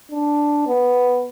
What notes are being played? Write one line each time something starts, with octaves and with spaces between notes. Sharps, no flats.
D4
B3